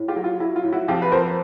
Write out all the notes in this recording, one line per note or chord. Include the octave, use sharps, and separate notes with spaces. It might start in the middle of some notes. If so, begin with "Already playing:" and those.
Already playing: A2
F4 G4
F#3
F4
F#3 E4
F4
A2
E4 F#4
F2 F4 G4
B4
F2 A#4 C5